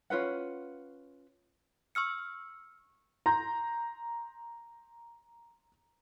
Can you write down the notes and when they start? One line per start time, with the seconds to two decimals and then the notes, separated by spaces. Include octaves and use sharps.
0.10 C#4 F4 B4 F#5
1.95 C#6 E6 F6 C#7
3.26 A#5 C6 G6